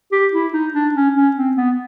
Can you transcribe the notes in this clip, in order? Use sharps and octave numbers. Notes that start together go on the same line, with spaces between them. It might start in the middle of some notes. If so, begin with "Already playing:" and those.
G4
E4
D#4
D4
C#4
C#4
C4
B3